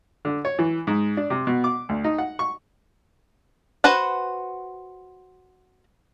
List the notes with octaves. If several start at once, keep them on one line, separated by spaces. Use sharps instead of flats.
D3
C#5
E3
G#2
D4
C3
B2
D6
D2
D#4
F#5
C#6
F#4 B4 C5 F#5